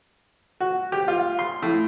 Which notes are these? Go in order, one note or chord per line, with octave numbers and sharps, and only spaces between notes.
F#4
G4
F4
C6
A2